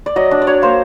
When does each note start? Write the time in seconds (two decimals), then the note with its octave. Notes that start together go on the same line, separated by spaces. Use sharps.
0.06 D5
0.16 F#3 D#5
0.31 D4 D5
0.42 D5
0.47 F#3 C#5
0.62 A#3 C5